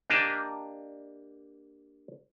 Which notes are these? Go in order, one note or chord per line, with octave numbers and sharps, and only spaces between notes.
A#3 D4 G4 D#5 A5